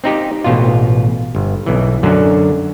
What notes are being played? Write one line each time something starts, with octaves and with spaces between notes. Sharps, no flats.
C4 D#4 G4
A1 B2 F4
G1
B1 E3
F#2 D3 F#3